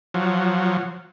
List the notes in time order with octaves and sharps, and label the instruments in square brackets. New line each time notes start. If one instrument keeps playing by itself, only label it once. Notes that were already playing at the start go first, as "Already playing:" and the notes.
[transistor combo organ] F3 F#3